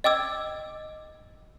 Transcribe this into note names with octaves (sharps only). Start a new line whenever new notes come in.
D#5 G5 D6 E6 G#6